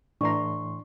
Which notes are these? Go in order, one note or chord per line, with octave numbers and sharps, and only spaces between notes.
A2 E3 D4 D5 A#5 C6 C#6